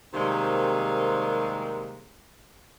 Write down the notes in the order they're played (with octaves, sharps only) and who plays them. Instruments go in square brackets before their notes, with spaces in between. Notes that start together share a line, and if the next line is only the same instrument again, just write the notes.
[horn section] C3 D#3 G3 G#3 A#3 C4